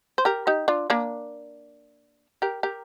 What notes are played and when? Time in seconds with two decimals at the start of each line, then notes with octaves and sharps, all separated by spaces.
0.18 C5
0.25 G4 A#4
0.47 D#4 G4
0.68 D4 F4
0.90 A#3 D4
2.42 G4 A#4
2.63 G4 A#4